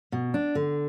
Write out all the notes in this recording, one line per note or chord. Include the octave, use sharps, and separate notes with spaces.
B2
D4
D3